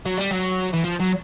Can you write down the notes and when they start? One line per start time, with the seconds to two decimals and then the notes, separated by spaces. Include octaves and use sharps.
0.06 F#3
0.18 G3
0.31 F#3
0.73 E3
0.84 F3
1.00 F#3